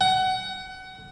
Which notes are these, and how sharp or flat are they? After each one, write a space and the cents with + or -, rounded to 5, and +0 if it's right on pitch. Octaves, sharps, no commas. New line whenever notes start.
F#5 +25